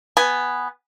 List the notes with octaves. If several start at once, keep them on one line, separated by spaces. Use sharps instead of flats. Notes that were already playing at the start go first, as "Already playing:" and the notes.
B3 G#5